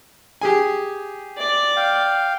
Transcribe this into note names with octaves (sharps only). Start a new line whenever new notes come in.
G4 G#4 G#5
D5
F5 G5